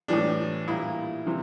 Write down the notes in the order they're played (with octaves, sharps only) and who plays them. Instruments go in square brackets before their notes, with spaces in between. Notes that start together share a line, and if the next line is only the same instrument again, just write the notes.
[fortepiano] A2 E3 G3 D4
A#2 G3 E4
C3 E3 G3